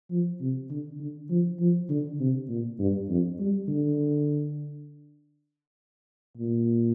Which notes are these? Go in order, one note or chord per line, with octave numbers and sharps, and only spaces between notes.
F3
C3
D3
D3
F3
F3
D3
C3
A#2
G2
F2
G3
D3
A#2